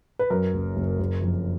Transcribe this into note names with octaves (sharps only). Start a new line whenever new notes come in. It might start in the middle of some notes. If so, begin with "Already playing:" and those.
B4
F#2 A#4
F#1
F#1
F#1
F2